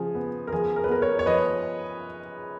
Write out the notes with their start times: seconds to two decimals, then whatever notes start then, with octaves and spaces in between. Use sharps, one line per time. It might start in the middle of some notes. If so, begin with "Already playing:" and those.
Already playing: C#3 F3 G#4
0.15 B3
0.47 A#4
0.52 F3 G#4
0.76 A#4
0.84 B4
0.89 B3 A#4
1.01 A#4 C#5
1.19 C#5
1.26 F3 B4 D#5